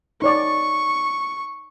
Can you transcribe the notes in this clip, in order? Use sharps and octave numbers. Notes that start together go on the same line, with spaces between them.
D#4 C#5 D5 C#6